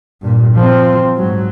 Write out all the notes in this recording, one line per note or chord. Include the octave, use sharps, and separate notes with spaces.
G2 A#2
F3 C4
G#2 F#3